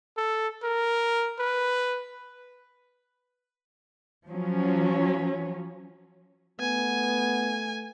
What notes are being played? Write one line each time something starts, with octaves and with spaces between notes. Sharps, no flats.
A4
A#4
B4
F3 F#3 C#4
A3 B3 G#5